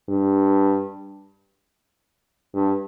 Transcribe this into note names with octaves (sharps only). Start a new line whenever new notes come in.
G2
G2